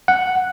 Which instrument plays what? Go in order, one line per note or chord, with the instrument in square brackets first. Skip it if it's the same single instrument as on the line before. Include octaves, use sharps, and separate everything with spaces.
[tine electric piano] F#5